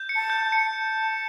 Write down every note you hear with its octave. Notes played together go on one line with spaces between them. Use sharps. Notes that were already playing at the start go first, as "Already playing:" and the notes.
Already playing: G6
C#7
A5
G6
A5
C#7